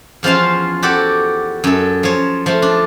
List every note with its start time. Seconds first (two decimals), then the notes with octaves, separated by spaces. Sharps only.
0.23 E2 F3 C#4 F4 F5
0.82 F#4 G4 A4 D5
1.64 F#2 A4
2.03 F3 C#5
2.46 F3 A3
2.62 D4